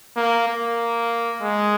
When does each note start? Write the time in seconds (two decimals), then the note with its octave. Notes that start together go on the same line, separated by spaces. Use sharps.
0.17 A#3
0.48 A#3
1.42 G#3